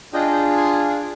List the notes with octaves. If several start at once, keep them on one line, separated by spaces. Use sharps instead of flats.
D4 F4 G#4 D#5 G5
G#5 C6
D6